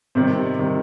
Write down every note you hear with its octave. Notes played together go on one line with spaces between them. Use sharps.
C3 D#3 G3 C4
C3 D#3 G3